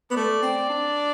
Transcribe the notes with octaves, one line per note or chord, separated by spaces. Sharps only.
B3
A3 D5
C4
D4